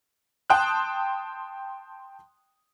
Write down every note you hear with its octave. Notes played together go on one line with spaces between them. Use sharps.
G5 A5 C6 D#6 F#6